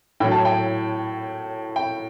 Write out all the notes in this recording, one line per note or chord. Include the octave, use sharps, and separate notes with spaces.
A2 F#3 G5
A5
G5
G5